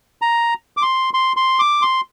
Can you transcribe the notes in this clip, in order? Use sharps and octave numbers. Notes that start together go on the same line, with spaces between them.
A#5
D6
C6
C6
C6
D6
C6